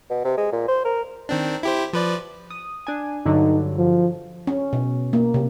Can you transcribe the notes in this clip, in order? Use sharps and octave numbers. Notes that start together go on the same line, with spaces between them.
B2
C3
G#3
A#2
C5
A#4
D#3 C4 D4
E4 G4 C5
F3 B4 D5
D#6
D4 G#5
G2 D3 F#3 D#4
F3
C#4
B2
A#3
C3